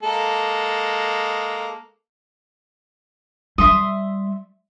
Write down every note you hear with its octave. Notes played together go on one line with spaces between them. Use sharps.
G#3 A#3 A4
G3 E5 C6 D#6